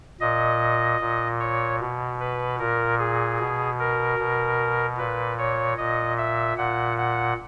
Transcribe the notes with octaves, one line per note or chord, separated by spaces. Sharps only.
A#2 D#5
A#2
C#5
B2
B4
A#2 A#4
G#4
B2
A#4
B2
A#2 B4
C#5
A#2 D#5
E5
A#2 F#5
F#5